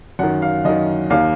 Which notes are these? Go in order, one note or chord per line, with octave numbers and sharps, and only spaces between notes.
F#2 D#3 F#5
F5
F#2 D#3 D#5
D#2 D#3 F5